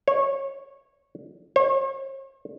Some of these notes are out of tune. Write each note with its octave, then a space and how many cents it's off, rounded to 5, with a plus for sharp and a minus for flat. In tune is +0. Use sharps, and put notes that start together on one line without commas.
C#5 -20
C#5 -45